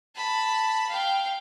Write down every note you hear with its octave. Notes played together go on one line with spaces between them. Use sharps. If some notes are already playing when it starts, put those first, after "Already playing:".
A5 B5
F5 G5